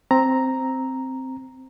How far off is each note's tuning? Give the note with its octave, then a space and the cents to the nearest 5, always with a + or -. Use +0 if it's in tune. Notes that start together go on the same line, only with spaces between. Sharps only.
C4 +0 A#5 +0